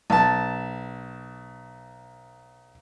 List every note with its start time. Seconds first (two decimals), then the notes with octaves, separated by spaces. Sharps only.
0.10 B1 A5